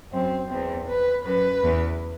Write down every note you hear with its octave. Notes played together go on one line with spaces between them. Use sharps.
F#2 C4
E2 C4
B4
F#2 B4
E2